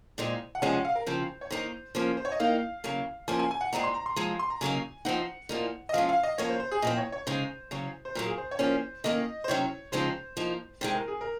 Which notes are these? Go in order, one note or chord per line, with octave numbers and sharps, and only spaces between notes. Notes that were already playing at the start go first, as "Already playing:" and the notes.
A#2 G#3 C4 D#4
F#5
C3 F3 G#3 C#4 G#5
F#5
F5
A#4
C#3 F3 C4 C5
C#5
D#3 A#3 D#4 C5
F3 A#3 C#4 C5
C5
C#5
D#5
D#3 A#3 D#4 F5
C#3 F#3 A#3
F3 A#3 C#4 G#5
G#5
G#5
F#5
A#2 G#3 C4 D#4 A#5
C6
A#5
C6
F3 G#3 C4 D#4 A#5
C6
A#5
C#3 F#3 A#3 D#4 G#5
F3 C4 D#4 F#5
A#2 F3 A#3 D#4
D#5
F3 G#3 C#4 F5
F5
D#5
F3 A#3 C#4 C#5
C5
C5
G#4
A#2 F3 C4 D#5
C#5
C#5
C#3 G#3 D#4 C5
C#3 F#3 C#4
C5
A#2 F#3 A#3 A#4
G#4
C5
C#5
F3 A#3 C#4 C5
D#3 A#3 C#4 D#5
C5
C3 D#3 F#3 C#4 C#5
C#3 F3 G#3 C4 D#4 C5
F3 A#3 D#4
C3 D#3 G#3 C5
A#4
G#4
A#4